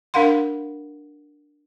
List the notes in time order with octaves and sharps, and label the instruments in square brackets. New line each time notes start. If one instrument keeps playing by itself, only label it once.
[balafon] D4 A#4 F5 F#5 C6